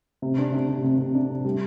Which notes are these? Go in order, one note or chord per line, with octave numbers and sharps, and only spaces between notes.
C3
D4
C3
C3
C3
C3
D4
C3
G3